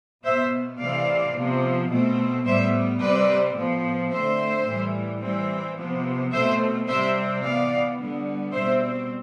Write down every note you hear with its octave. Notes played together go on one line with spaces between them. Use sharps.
B2 B3 C5 E5
C3 E3 A3 C4 D5 F5
C3 F3 B3
B2 A3 C4
A2 G3 B3 C5 E5
C3 G3 C4 B4 D5
A2 F3 B3
D3 A3 C4 C5 E5
A2 E3 G3
E3 G3 C4
C3 F3 B3
B2 A3 C4 C5 E5
C3 G3 C4 C5 E5
E3 B3 D5 F5
D3 G3 B3
B2 G3 C4 C5 E5